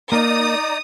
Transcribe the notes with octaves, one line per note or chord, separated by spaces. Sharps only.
A#3 D#4 D5 A#5 D#6